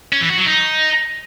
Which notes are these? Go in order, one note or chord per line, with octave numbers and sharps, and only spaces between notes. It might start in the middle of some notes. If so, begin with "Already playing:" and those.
C#4
E3
F#4
F#3
D#4